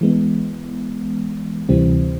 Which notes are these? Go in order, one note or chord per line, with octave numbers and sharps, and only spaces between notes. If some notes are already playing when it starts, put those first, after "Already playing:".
E3 G#3 B3
D2 C3 E3 G3 C4